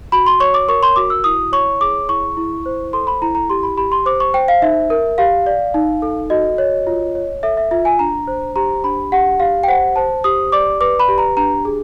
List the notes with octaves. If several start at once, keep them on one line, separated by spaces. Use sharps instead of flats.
F#4 B5
C6
C#5 C#6
D6
A#4 C#6
C6
F#4 D6
E6
E4 D#6
C#5 C#6
G#4 D6
E4 C#6
E4
C5
A4 C6
B5
E4 A#5
A#5
G4 C6
B5
G4 B5
C6
C5 D6
C#6
C5 G5
F5
D#4 E5
A#4
G4 F5
D5
D#4
A4
F#4 D#5
C#5
F4
C#5
A4 E5
E5
F4 E5
G#5
D4 A#5
C5
G4 A#5
D4 B5
G4 F#5
G4 F5
G5
C5 F#5
C5 A5
G4 D#6
D5 D6
B4 D6
B5
G4
A#5
D4 A#5
G#4